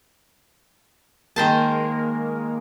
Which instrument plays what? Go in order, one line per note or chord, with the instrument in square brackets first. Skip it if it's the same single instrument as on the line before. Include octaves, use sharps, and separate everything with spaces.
[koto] D#3 C5 A5 [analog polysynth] G#3 A#3 A#4